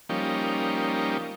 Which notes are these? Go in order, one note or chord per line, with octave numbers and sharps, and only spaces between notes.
F3 G3 A#3 C#4 D#4